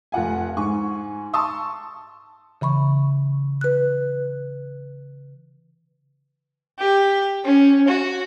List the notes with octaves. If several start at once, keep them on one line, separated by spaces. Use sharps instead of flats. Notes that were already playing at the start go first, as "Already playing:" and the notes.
F1 F4 F#5 G#5
G#2 G#5 C#6
A5 C6 C#6 D#6 E6
C#3 E3 B5 C#6
B4 F#6
G4
C#4
F#4